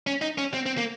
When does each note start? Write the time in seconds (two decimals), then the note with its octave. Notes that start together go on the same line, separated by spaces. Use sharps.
0.07 C#4
0.21 D#4
0.38 C#4
0.54 C4
0.66 C4
0.78 A#3